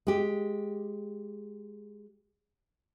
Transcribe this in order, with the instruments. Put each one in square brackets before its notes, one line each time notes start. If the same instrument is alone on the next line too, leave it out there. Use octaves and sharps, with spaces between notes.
[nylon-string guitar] G#3 G4